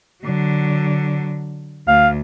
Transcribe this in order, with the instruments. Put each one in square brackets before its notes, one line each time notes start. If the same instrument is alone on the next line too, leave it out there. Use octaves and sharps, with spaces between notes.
[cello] D3 F#3
[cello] D2 [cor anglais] F5